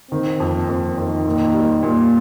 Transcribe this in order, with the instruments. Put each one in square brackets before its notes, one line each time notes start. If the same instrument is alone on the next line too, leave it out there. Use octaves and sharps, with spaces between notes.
[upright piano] D#3 [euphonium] C4
[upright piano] F2
[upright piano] F2 [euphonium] C4
[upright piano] F2 [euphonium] D#3
[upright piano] A#2
G3
A#2